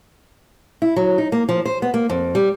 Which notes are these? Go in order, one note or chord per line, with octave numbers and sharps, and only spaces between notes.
E4
F#3
D#4
A#3
F3
C5
B3
A#3
F2
G3